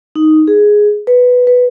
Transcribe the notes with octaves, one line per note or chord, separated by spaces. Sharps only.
D#4
G#4
B4
B4